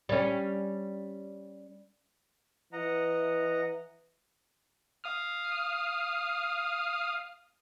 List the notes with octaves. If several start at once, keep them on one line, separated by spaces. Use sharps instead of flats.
G3 C#4
E3 D#5 F#5 A#5
F5 D#6 F6